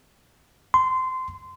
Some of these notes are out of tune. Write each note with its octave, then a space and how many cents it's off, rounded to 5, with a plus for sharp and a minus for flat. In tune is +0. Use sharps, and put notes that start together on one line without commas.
C6 -20